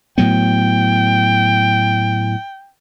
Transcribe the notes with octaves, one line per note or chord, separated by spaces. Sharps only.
A2 F#3 B3 G5